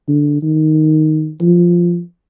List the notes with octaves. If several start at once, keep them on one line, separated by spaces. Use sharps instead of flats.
D3
D#3
F3